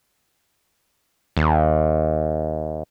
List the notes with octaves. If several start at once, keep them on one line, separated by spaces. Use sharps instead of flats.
D#2